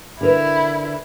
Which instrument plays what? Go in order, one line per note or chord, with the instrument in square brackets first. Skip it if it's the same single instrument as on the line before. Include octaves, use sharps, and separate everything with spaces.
[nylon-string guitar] D3 A#4 B4 [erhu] E4